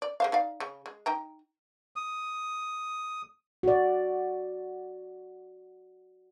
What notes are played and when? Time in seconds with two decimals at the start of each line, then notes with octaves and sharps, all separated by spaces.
0.02 D5
0.20 G#3 C5 F5
0.32 D#4 D5 F5
0.60 C#3
0.86 G#3
1.06 D#4 G5 A#5
1.96 D#6
3.63 F#4 D5